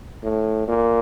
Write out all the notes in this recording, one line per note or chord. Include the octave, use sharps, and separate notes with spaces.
A2
A#2